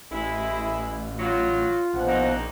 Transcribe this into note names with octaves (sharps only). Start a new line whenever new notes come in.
A1 G#3 E4
F#3 F4
A#1 B2 F3 F#5
A#3 C4 D#4